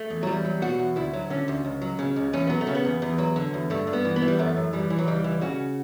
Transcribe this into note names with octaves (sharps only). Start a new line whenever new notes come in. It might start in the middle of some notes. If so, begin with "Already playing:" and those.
Already playing: A3
E2
F#3
E2 G3
F#3
B2 F#4
E2
D2 E4
F#3
D3 C#4
D2
C#2
F#3
C#3
C#2
E2 C#4
F#3 B3
A3
C#3
B3
E2
E2
F#3
D3
E2
G2 A3
G2
B3
E3
B3
E3
G3
F#2 A3
F#2
E3 G3
E3
F#3
C#2 G3
E3
C#3 F#4